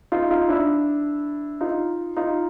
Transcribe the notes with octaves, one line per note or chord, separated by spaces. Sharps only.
D#4 F4
D#4 F4
D4 E4
D#4 F4
D#4 F4